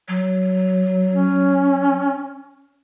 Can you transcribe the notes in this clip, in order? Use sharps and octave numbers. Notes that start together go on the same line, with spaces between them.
F#3
C#4